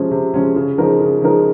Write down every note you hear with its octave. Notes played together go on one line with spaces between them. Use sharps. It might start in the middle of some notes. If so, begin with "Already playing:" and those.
Already playing: C3 F3 G#3 C#4
C3
F3 G#3 C#4
C#3
F3 G#3 D#4 A#4
C#3
F3 G#3 D#4 A#4